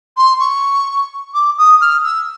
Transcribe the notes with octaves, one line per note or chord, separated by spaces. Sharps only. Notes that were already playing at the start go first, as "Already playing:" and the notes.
C6
C#6
D6
D#6
F6
E6